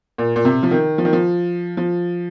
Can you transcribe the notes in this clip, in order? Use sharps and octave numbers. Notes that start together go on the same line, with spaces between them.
A#2
A#2
C3
F3
D#3
F3
D#3
F3
F3